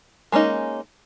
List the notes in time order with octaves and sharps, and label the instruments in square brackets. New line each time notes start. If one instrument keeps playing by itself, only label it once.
[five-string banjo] G#3 A#3 C#4 D#4